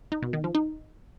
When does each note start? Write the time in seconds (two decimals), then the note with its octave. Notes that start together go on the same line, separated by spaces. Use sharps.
0.12 D#4
0.23 B2
0.33 D#3
0.44 F3
0.55 D#4